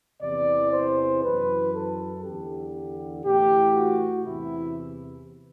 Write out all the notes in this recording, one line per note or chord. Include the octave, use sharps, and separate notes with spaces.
E2 C3 E3 D5
C5
F#2 E3 B4
A4
E2 D3 G4
A2 E3 G4
F#4
E2 C3 E3 E4